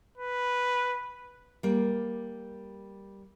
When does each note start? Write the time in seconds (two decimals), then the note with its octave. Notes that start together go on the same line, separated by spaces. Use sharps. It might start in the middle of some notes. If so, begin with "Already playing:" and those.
0.18 B4
1.63 G3 A#3